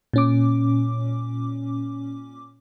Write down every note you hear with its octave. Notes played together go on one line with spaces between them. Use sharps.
A#2 C#4 D6